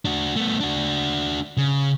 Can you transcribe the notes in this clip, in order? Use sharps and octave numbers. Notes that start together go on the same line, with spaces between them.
D4 F#4
A3 B3
D4 F#4
C#3